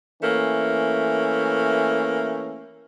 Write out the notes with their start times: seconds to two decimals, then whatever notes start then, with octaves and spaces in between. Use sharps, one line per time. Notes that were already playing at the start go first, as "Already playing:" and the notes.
0.22 E3 A3 A#3 C#4